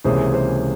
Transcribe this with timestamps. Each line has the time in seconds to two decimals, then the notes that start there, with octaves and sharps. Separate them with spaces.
0.04 C#2 C3 E3 A#3 C#4 G#4 C5
0.33 G#4 C5